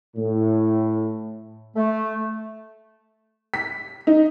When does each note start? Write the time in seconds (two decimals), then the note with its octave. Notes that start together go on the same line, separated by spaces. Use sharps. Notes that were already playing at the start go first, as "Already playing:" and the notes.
0.17 A2
1.76 A3
3.54 B6
4.07 D#4